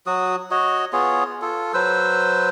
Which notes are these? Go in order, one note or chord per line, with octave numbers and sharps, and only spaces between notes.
F#3 F#4 D#6
F#4 C#5 D#5
B3 F4 G#4 C#5
F4 A4
F#3 B4 C5 E6